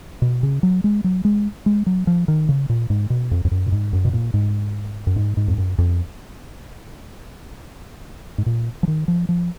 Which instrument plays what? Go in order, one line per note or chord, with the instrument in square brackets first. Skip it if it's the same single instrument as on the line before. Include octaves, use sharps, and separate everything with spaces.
[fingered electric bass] B2
C#3
F#3
G#3
F#3
G#3
G#3
F#3
F3
D#3
C#3
A#2
G#2
B2
F2
F2
F#2
A#2
G#2
F#2
B2
A#2
G#2
F#2
G#2
G#2
F2
F#2
F2
G#2
A#2
F3
D#3
F3
F3